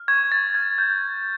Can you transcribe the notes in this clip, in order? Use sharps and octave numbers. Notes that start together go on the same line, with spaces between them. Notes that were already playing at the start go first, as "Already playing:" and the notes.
Already playing: F6
C#6 G#6
A6
F6 G#6
G6